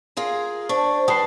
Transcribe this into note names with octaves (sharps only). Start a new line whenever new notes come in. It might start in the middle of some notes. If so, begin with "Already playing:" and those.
F4 G#4 A#4
D4 C5 C#6
G3 B4 A5 D#6 C7